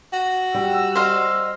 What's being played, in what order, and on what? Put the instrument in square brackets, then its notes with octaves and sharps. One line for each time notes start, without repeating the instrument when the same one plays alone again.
[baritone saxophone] F#4
[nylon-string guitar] G3 [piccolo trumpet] E6
[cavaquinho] C5 D#5 F5